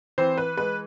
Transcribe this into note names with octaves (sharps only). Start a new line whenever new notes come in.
E3 C4 C5
B4
G#3 B4